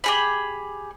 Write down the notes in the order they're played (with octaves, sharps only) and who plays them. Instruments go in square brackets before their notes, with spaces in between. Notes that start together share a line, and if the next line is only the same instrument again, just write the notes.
[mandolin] G4 G#4 B5